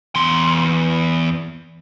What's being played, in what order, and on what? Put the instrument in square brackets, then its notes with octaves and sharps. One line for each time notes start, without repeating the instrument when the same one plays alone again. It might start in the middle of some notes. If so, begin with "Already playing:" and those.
[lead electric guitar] E2 C6